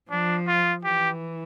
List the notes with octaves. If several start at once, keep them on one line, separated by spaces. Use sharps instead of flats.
F3 D4
F4
E3 G4